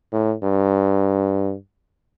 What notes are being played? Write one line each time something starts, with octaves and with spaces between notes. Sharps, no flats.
A2
G2